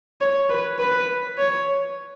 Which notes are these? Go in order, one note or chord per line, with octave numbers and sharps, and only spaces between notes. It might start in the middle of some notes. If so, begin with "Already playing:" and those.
C#5
B4
B4
C#5